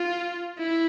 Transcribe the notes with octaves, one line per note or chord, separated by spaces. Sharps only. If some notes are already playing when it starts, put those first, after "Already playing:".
Already playing: F4
E4